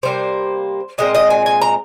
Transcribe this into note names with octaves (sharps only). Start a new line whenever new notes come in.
C3 G3 A#3 C5
A#2 G#3 C4 D#5
D#5
G#5
G#5
A#5